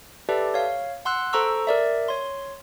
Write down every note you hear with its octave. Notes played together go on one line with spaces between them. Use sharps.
G4 A4 B4 D5 E5 A5
C#5 F5
F#5 C6 E6 F#6
A4 C5 A#5 C#6 E6
A#4 D5 E5
C#5 C6